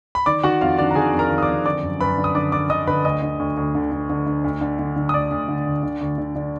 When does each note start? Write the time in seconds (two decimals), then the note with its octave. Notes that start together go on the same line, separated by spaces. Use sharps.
0.15 B5
0.26 D#3 D5 D6
0.43 D#3 F#4 F#5
0.61 F2 F4 F5
0.78 D#3 D4 D5
0.91 A#5
0.95 D#3 G#4 G#5
1.13 F2
1.19 A#4 A#5
1.31 D#3
1.38 D#6
1.42 D5 D6
1.48 F2
1.65 D3 D5 D6
1.83 F#2
2.00 F#2 B4 B5
2.18 D3
2.24 D#6
2.35 D3 D5 D6
2.52 D3 D5 D6
2.70 D3 D#5 D#6
2.87 D3 B4 B5
3.05 D2 D#5 D#6
3.22 D3
3.39 D2
3.57 D2
3.75 D3
3.92 D3
4.09 D3
4.26 D3
4.44 D2
4.61 D3
4.79 D3
4.96 D3
5.09 D#6
5.14 D2 D5 D6
5.31 D2
5.48 D3
5.66 D2
5.83 D3
6.01 D2
6.18 D3
6.35 D3